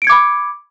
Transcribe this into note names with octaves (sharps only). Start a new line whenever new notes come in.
B5 D6 G#6 C#7 D7